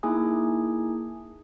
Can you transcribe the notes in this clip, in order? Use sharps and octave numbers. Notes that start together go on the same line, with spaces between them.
A#3 D#4 E4 G#4 G#5 D#6